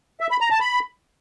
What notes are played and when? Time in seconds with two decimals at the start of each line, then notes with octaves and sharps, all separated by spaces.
0.21 E5
0.31 B5
0.41 A#5
0.51 A5
0.61 B5